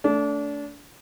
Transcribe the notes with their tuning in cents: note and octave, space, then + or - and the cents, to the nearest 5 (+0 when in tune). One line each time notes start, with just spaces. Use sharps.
A3 +0 D4 -30